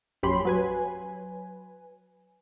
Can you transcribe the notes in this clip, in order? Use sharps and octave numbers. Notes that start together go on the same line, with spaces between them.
A#1 F#2 C#4 G4 B5 C6
F#3 B4 G#5